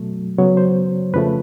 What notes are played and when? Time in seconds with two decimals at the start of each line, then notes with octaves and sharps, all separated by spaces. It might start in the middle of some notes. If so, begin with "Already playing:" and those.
Already playing: B2 F#3 A3
0.38 C#3 F#3 B3 C#5
0.57 C5
1.13 F2 C#3 F3 A3 B4